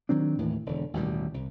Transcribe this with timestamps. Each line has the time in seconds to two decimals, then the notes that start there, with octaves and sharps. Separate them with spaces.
0.09 D#3 F#3 C4 D4
0.39 D#2 A2 E3
0.66 E1 D3
0.93 A1 D#2 B2 G3
1.34 C2